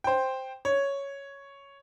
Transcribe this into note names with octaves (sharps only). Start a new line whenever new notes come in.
C5 G5
C#5